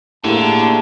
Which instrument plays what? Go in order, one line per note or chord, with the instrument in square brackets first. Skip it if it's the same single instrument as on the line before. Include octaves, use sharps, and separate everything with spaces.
[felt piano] A2 A#3 [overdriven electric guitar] D3 [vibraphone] G4 G#4 F5 [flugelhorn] A5